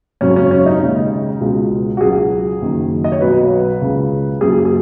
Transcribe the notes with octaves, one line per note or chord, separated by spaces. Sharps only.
G#1 F#2 C#3 F#3 C#4
C#4
C#4
D#4
D#2 C#3 G#3
C#2 B2 G#3
F#4
C#2 C#3 F#3 G#4
F#1 F#2 D#3
D#5
C#5
B1 B2 F#3 B4
C#2 C#3 G#3
F#1 F#2 F#3 G#4
G#4